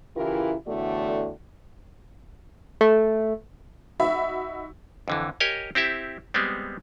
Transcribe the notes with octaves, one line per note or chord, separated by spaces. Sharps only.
C#3 E3 E4 F4 G4 A#4
E2 A2 D3 A3 F#4 D5
A3
D#4 F#4 E5 B5
F2 D3 E3
G4 A#4 C#5 D#5 G#5
C4 E4 G4 E5
G3 G#3 B3 C4